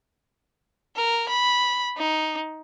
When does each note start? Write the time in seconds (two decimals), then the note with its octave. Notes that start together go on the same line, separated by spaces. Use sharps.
0.96 A#4
1.29 B5
1.97 D#4